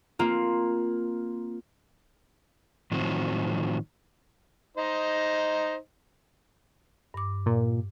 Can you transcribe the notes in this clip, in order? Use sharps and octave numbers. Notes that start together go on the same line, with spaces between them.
A#3 C4 F4
A2 D#3 F3 F#3 C4 F#4
D#4 C5 D#5
G2 D6
A#2